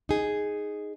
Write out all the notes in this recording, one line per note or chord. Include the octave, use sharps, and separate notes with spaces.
D#4 G#4